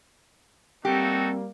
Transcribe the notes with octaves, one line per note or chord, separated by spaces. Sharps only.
G3 A#3 C4 D#4 F#4 G4 A4